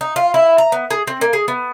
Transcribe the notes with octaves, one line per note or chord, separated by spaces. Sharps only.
D#4
F4
E4
A#5
B3
G#4
C4
A#3
G#4
B3